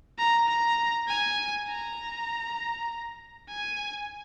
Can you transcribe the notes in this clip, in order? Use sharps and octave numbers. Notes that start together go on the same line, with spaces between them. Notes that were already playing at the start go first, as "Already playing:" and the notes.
A#5
A#5
G#5
A#5
G#5